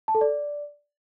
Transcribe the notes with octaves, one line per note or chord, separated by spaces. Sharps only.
A5
A4
D5